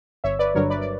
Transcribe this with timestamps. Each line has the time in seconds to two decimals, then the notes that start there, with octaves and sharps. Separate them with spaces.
0.24 G1 C#5 E5
0.39 B4 D5
0.55 G2 D3 F#3 A#4 C#5
0.70 B4 D5
0.81 D5